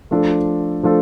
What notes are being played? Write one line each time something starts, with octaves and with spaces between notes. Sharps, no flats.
F3 A3 D4 F4 A4
F3 A3 D4 F4 A4